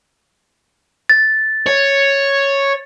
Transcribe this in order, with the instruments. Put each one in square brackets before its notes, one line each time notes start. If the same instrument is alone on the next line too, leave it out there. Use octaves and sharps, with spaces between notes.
[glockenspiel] A6
[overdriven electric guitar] C#5